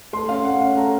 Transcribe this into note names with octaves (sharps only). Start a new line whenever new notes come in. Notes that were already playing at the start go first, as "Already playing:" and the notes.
A3 C6
C#4 F5
A3 F#5
C#4 F5
A3 A#5